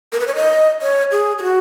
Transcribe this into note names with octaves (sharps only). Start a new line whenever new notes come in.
A#4
B4
C#5
D#5
C#5
G#4
G#4
F#4